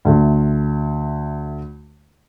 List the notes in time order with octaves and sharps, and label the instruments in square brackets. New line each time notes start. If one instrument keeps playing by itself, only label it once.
[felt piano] D2 A3